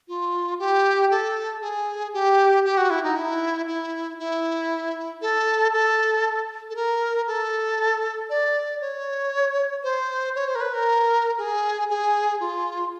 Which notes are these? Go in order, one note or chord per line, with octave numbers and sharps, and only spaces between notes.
F4
G4
A4
G#4
G4
G4
F#4
E4
D#4
E4
E4
E4
A4
A4
A4
A#4
A4
D5
C#5
C5
C#5
C5
A#4
B4
A#4
G#4
G#4
F4